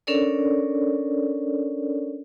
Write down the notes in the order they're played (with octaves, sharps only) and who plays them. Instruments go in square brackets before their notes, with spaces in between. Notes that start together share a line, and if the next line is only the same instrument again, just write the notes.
[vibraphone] C#4 D4 A4 A#4 C#5 D5